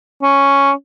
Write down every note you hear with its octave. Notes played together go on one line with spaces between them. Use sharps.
C#4